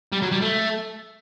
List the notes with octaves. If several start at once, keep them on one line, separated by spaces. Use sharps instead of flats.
G3
F#3
G3
A3